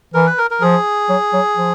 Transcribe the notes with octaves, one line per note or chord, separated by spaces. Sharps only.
E3 A#4
B4
A#4
A#4
F3 G#4
F#3
F#3
F3